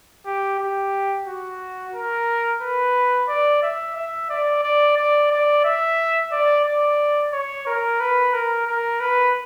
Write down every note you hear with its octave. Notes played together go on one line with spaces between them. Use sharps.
G4
G4
F#4
A#4
B4
D5
E5
E5
D5
D5
D5
D5
E5
D5
D5
C#5
A#4
B4
A#4
A#4
B4